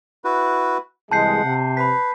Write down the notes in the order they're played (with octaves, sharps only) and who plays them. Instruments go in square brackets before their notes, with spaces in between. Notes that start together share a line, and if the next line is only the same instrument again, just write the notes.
[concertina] E4 F#4 B4
[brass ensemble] C2 E3 G#3 [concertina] F#5 [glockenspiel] A5 G6 C7
[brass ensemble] C3
[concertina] B4 [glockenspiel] B5 B6